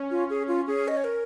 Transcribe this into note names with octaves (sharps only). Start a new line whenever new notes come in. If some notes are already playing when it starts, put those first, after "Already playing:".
Already playing: C#4
F4
G#4
F4
C#4 G#4
D#5
C#5
A#4